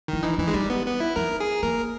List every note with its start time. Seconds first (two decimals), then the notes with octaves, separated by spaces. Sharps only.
0.08 D#3 E4
0.23 E3 D#4
0.38 E3 D#4
0.48 G#3
0.54 G3 D#4
0.70 B3
0.86 B3
1.00 E4
1.16 D#4 A#4
1.40 G#4
1.63 A#3 A#4